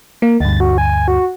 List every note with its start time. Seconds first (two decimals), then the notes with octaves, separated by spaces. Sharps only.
0.22 A#3
0.40 D2 G2 A6
0.60 F#4
0.78 G#5
1.08 F#4